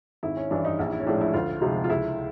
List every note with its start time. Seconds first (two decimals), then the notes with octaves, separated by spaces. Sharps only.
0.23 G#1 E4
0.37 C#4
0.51 G2 E3 D4
0.65 D#4
0.79 A#1 E4
0.92 E4
1.00 C#4
1.06 A2 F3 G#3 D4
1.21 E4
1.33 D2 F4
1.61 C3 F3 G#3 D#4
1.84 F4
1.90 C#2 E4